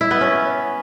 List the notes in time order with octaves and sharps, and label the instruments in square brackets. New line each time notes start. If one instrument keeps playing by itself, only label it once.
[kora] E4
B3
C#4